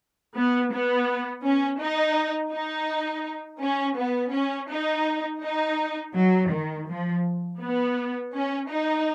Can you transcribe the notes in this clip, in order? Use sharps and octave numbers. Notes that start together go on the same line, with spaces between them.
B3
B3
C#4
D#4
D#4
C#4
B3
C#4
D#4
D#4
F#3
D#3
F3
B3
C#4
D#4